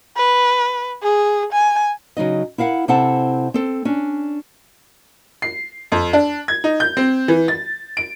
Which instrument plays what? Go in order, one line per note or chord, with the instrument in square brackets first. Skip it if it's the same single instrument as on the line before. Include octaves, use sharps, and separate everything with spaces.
[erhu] B4
G#4
G#5
[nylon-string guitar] C#3 F#3 D#4 D#5
E4 A#4 F5 F#5
C3 C4 E4 A4 F#5 A5
C4 A4
C#4 D4
[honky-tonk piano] C7
F2
D4
G#6
D#4
G6
C4
E3
A6
D7